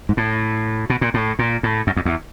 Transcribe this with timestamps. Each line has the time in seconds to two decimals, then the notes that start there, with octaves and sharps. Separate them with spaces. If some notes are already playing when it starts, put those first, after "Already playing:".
0.09 G#2
0.17 A2
0.90 B2
1.01 A#2
1.14 A2
1.39 A#2
1.63 A2
1.87 F#2
1.96 F2
2.05 E2